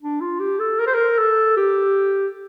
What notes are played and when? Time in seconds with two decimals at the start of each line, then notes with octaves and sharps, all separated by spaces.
0.02 D4
0.21 F4
0.40 G4
0.59 A4
0.80 A#4
0.87 C5
0.94 A#4
1.18 A4
1.57 G4